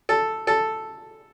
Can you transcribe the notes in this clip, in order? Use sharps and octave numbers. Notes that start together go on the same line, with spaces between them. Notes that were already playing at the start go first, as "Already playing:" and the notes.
A4
A4